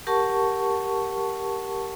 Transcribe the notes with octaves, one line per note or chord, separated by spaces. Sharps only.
G4 A#4 F#5 A5 C#6